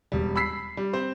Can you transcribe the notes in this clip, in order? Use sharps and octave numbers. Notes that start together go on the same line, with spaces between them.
E1 G3
B5 E6 B6 C7
G3
C4 C5